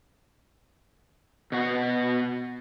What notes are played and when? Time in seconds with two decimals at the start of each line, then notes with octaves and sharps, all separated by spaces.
1.52 B2 F#4